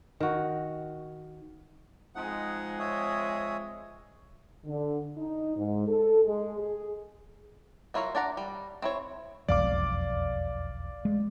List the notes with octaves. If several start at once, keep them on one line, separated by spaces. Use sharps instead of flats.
D#3 F#4
F3 G#3 C4 D#4 F#5
C#5 E5 D#6
D3
D#4
G#2
A4
G#3
G#4
F#3 E4 F4 A#4 C#5
D4 D5 F#5 A#5
G3
C4 E4 C#5
E1 B1 F2 D5 F5 D6
G#3